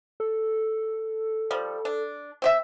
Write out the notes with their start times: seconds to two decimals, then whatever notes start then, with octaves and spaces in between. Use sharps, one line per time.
0.20 A4
1.51 F3 G3
1.85 D4
2.42 C4 G4 E5